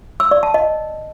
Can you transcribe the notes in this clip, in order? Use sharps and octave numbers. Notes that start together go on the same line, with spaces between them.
E6
D5
A5
D#5